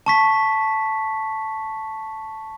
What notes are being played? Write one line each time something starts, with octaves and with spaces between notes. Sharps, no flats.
A5 C#6 B6